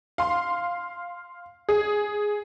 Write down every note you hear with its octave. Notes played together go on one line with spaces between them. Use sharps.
F5 C6
G#4